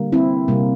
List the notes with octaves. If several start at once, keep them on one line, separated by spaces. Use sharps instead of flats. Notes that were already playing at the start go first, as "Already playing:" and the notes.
Already playing: D3 G3 A#3
C4 E4
C3 G3 A#3